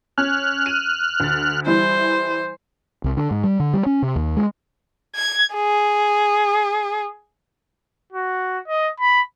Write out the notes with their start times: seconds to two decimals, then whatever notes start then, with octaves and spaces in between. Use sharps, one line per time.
0.18 C#4 F6 F#6
0.66 D#7
1.20 D2 A6
1.66 E3 G3 E4 C5
3.04 C2
3.17 D3
3.31 G#2
3.44 G3
3.60 D3
3.74 G3
3.86 C#4
4.02 C3
4.16 D#2
4.37 G#3
5.16 G#6
5.55 G#4
8.13 F#4
8.68 D#5
9.00 B5